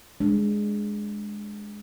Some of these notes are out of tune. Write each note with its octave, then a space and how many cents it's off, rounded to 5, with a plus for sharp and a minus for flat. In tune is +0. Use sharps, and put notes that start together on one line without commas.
G#3 +0 D4 +0